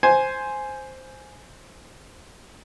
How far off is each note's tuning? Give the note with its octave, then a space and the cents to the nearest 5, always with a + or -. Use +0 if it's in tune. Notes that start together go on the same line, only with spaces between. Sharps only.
C5 +0 G#5 +5